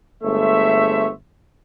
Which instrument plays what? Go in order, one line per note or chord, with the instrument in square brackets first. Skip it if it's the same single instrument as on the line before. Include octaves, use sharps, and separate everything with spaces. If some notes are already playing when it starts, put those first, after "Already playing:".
[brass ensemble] G1 G#3 A3 C5 C#5 E5